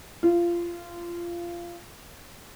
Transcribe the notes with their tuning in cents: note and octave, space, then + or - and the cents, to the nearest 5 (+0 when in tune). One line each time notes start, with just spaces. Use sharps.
F4 -20